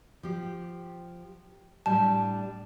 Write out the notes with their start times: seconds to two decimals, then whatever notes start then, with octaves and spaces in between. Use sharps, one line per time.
0.23 F3 G4
1.86 A2 G3 D4 A5